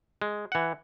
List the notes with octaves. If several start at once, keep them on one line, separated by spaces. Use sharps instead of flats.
G#3
E3 F#5